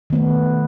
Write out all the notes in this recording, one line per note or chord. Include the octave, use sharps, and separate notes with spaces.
D#3 A3 B3